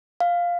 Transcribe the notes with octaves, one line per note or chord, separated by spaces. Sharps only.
F5